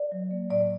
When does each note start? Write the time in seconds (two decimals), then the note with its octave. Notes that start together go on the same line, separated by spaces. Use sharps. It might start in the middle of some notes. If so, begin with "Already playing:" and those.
Already playing: D5
0.12 F#3
0.31 A#3
0.50 A2 D5